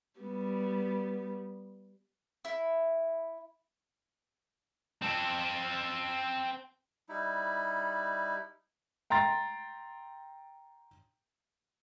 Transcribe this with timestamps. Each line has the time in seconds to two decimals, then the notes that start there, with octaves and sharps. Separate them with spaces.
0.20 G3 B3
2.45 E4
5.02 C4 A4
7.09 G3 D#4 E4
9.10 G5 A#5 C6 A6